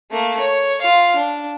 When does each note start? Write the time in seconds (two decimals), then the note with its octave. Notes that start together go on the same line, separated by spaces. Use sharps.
0.11 A3 A#3
0.40 C#5
0.81 F4 F5
1.16 D4